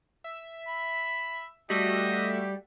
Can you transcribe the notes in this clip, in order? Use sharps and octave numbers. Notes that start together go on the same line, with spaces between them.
E5
B5
G3 A3 F#4 G4 D#5 E5